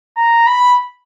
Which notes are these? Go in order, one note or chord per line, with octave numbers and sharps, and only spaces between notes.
A#5
B5